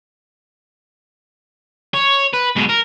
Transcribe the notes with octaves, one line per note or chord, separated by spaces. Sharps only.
C#5
B4
G#2 B2
A#4